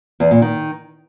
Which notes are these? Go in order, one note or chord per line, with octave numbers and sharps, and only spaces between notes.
E2
A#2
D#3